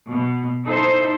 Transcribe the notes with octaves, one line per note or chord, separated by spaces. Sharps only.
B2
D#4 E4 A4 C5